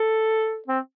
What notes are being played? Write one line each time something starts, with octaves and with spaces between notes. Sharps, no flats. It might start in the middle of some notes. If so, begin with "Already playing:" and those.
Already playing: A4
C4